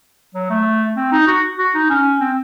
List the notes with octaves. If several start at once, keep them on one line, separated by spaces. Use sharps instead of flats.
F#3
A3
C4
D#4
F#4
F#4
D#4
C#4
C4